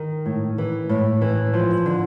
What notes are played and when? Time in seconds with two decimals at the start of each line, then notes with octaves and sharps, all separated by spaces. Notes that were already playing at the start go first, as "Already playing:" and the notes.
Already playing: D#3
0.26 A2
0.58 E3
0.89 A2
1.21 E3
1.53 F3
1.86 D3